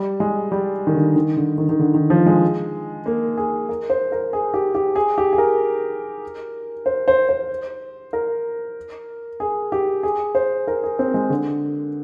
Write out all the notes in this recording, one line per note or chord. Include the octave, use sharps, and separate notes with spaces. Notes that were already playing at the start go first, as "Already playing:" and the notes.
Already playing: G3
G#3
G3
D#3
D3
D#3
D3
D#3
D#3
D3
D#3
F3
G#3
A#3
G#4
A#4
C5
A#4
G#4
G4
G4
G#4
G4
G#4
A#4
C5
C5
C5
A#4
G#4
G4
G#4
C5
A#4
G#4
C4
G#3
D3